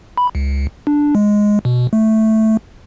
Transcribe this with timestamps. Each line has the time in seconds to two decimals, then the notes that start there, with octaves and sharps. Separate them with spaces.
0.17 B5
0.35 C#2
0.87 D4
1.15 G#3
1.65 B2
1.93 A3